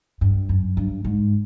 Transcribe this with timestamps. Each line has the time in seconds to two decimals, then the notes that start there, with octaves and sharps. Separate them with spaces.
0.21 G2
0.49 F#2
0.77 G2
1.04 G#2